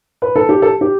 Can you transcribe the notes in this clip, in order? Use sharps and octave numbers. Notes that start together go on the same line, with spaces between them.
B4
A4
G4
A4
G4